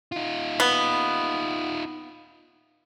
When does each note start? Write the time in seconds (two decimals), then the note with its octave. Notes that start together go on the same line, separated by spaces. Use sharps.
0.12 D#4 F4
0.60 B3